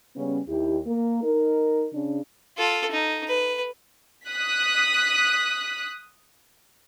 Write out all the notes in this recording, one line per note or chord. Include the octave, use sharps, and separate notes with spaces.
C#3 G3 B3 C#4
D#2 E4 G4
A#3 A#4
D#4 A#4
C#3 D4
F4 A4
D#4
B4
D#6 F#6 B6